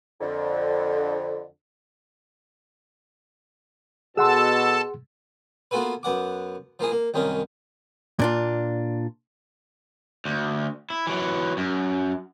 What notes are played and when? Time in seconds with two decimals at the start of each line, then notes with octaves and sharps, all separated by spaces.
0.21 F2 D3
4.17 B2 G#4 A4 F#5 A5 C6 E6
5.71 A#3 B3 F4 F#4 A4 B4
6.03 F#2 B3 F#5 D6
6.79 F3 A#3 E4 G#4
6.92 A#3
7.14 C2 F#2 D#3 C#4 A#4
8.19 A#2 D4 F4
10.25 D2
10.90 E4
11.07 E3 F#3
11.57 F#2